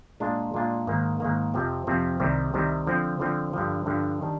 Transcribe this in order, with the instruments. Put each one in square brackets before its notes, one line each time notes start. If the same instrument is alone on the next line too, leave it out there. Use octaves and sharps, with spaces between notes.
[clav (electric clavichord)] A#2 G#3 D4 F4
A#2 G#3 D4 F4
G#2 D#3 A#3
G#2 D#3 A#3
F2 C3 F3 C4
F2 C3 F3 C4
C2 C3 D#3 G3
C2 C3 D#3 G3
D3 F3 C4
D3 F3 C4
G2 D3 F3
G2 D3 F3
D#3 G3 D4